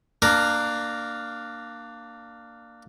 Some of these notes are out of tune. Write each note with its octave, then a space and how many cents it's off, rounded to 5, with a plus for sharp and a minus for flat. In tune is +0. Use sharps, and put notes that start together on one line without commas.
A#3 +0 D4 +20 A#4 +0